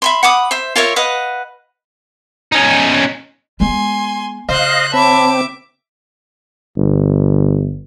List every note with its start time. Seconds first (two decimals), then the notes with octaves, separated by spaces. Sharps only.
0.02 E5 B5 C6
0.23 F#5 B5 D6 D#6
0.51 C5 E5
0.76 F4 A#4 C#5 E5
0.96 B4 D#5 F5 F#5
2.52 C#4 D#4
3.60 G#3 B3 G#5 C6
4.49 C#3 C5 D#5 F5 F#6
4.94 C4 C#5 E5 A5 B5 D6
6.76 G1